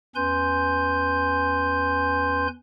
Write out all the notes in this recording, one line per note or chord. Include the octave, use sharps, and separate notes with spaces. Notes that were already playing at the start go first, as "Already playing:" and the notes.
E2 C#4 B4 G#5 C6 G6